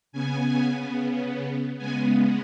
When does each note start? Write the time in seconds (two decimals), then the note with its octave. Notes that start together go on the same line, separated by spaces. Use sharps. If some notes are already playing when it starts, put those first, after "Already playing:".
0.12 C#3 B3 G#5
1.78 C#3 G#3 B3 G#5